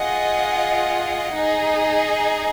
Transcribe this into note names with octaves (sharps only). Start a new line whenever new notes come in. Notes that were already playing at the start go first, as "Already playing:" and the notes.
Already playing: F4 G#4 D#5 F#5
D#4 G#4 D#5